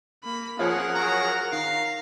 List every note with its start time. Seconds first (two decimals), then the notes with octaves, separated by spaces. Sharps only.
0.24 A#3 B5
0.59 F3 C#4 F4 G#4 A#4 F#5
0.95 F#3 F#4 G#4 A#5
1.52 D#3 F5 A#5